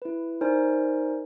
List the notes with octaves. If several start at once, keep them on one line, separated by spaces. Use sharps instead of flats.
E4 B4
D#4 A#4 C5 D5 G#5